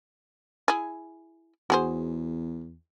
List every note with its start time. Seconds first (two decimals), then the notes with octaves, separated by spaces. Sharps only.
0.68 E4 G#4
1.70 E2 F#4 G#4 C5